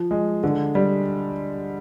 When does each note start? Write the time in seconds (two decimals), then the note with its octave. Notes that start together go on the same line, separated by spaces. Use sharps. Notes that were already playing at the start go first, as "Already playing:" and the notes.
Already playing: F3
0.11 G#3
0.43 D3
0.75 G3